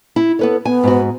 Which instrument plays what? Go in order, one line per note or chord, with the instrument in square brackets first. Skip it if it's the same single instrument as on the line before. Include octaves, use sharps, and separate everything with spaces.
[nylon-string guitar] E4
[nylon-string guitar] B3 B4 C#5 [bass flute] A4
[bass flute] B3 [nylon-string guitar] G#5
[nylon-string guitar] G#2 F#4